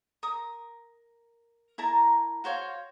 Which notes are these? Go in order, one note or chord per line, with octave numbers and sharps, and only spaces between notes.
A#4 D#6
E4 A#4 A5 A#5
F#4 C5 C#5 F5